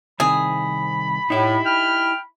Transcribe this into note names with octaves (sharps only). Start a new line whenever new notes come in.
C2 D#3 C4 G#4 B5
A2 D#4 E4 G4
G5 F6